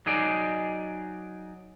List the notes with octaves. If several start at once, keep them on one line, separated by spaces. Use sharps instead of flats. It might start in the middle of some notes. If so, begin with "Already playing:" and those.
F#3 D#4 G#4 D5